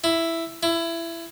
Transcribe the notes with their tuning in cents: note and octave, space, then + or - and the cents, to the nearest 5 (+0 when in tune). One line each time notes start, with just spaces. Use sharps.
E4 +5
E4 +20